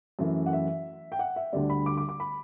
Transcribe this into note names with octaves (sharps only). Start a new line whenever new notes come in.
F#2 E3 A3
F#5
E5
G5
F#5
E5
D2 D3 G3 D5
B5
D6
D6
D6
B5